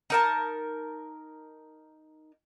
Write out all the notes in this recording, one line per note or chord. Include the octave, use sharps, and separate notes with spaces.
D#4 A#4 A5